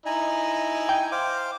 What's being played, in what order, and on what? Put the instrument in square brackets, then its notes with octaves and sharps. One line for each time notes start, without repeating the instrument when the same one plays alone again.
[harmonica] D#4 E4 [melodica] G#5 A#5
[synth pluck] G5
[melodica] C5 F5 D6